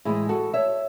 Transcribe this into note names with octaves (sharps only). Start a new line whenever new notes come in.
A2 E3 G#3 E4 G#4
F#4 A4
C#5 E5